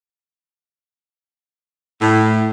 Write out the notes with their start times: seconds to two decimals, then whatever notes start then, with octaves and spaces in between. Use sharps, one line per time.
2.01 A2